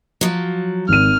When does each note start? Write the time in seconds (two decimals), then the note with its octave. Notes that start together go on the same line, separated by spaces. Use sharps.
0.21 F3 F#3
0.89 G#1 F6 D#7